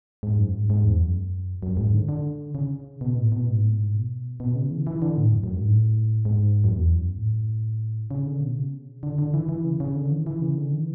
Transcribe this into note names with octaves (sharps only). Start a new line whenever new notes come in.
G#2
F#2
G#2
G#2
E2
F#2
F#2
G#2
D3
D3
C#3
B2
A2
B2
G#2
A2
G#2
B2
B2
C#3
E3
E3
D3
A2
F#2
F#2
G#2
A2
G#2
F#2
E2
F#2
A2
C#3
D3
B2
C#3
D3
D3
E3
E3
C#3
C#3
D3
E3
E3
C#3
D3
E3